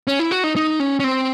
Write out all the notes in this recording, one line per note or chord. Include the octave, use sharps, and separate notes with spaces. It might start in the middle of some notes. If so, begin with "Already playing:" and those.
C#4
E4
F#4
D#4
D#4
C#4
C#4
C4